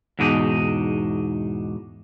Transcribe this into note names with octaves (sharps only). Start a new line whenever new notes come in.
E2 G#2 B2 D4 D#4